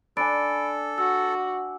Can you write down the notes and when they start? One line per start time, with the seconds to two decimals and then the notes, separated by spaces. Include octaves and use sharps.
0.17 D4 A4 G#5 B5 A6 D7
0.98 F#4 E6